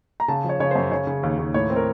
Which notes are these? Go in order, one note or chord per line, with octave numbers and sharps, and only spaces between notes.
A#5
C#3 A5
F3
C#5
C#3 C#5
F#2 C5
C#3 C#5
C#3
D#2
D#2
A2 C#5
C4
A#4